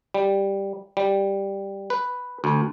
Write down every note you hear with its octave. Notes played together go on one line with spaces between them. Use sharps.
G3
G3
B4
D2